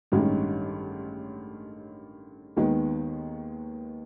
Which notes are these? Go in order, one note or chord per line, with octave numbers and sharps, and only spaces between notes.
A1 G2 D#3 G#3 C#4
D#2 D#3 G#3 B3